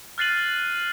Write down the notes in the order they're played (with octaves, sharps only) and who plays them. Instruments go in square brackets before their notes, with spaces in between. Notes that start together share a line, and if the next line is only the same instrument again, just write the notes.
[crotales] F6 F#6 A6 C7 D#7 F#7